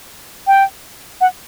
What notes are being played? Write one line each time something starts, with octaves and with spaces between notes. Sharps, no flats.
G5
F#5